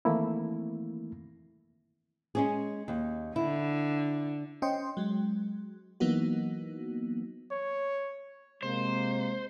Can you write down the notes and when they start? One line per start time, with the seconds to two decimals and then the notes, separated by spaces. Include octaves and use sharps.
0.05 D#3 E3 A3 A#3 C4 E4
2.35 G#3 C#4 G#4
2.88 D#2
3.36 D3 E4
4.62 C#4 C5 D#5 G5 C6
4.97 F#3 G#3
6.00 E3 F#3 A#3 B3 D#4 F#4
7.52 C#5
8.63 C3 G#3 A#3 C5